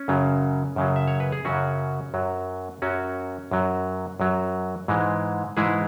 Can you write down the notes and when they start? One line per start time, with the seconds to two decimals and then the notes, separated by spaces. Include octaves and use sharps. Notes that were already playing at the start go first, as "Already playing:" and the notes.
Already playing: C#4
0.08 F#2 C#3 F#3
0.76 F#2 C#3 F#3
0.96 E5
1.08 C#5
1.20 B4
1.32 G#4
1.45 F#2 C#3 F#3 C#4 F#4
2.14 F#2 F#3
2.82 F#2 F#3 C#4 F#4
3.51 F#2 F#3
4.20 F#2 F#3
4.88 G#2 E3 G#3
5.57 G#2 E3 G#3 E4 G#4